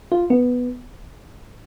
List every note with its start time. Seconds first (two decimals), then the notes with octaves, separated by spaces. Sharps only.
0.12 F4
0.30 B3